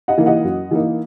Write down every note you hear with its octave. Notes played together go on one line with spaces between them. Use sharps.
D#5 F#5
E3 A#3 D#4
D#5 F#5
F#2
E3 A#3 D#4